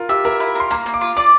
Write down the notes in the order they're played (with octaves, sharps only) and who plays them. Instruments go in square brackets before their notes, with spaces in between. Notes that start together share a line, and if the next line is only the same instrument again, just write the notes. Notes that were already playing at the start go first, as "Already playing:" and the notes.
Already playing: [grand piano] F4 A#4
[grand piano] G4 [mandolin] E5
[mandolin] E4 [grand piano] A#4
[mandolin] E4
[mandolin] A#4 [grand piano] C6
[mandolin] A#3 [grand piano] A#5
[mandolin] A#3
[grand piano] D6
[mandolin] F4
[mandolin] D5 [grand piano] D6